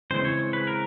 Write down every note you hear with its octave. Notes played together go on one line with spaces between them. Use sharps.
C#3 E3 G#3 C4 C5
C#5
B4
A#4